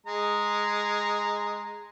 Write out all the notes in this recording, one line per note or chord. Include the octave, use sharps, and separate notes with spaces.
G#3 A#5